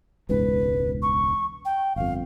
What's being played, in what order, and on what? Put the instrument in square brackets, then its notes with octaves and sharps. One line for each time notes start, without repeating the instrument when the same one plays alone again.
[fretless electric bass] E1 C#2 G#2 [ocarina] B4
[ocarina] C#6
G5
[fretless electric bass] G1 F2 [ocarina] F5